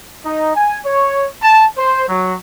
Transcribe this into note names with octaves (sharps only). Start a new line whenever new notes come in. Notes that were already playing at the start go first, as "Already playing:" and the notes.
D#4
G#5
C#5
A5
C5
F#3